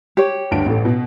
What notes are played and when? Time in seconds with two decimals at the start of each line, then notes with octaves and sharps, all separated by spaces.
0.17 G4 C#5
0.51 D2 G2 D7
0.66 A1 A3
0.85 B2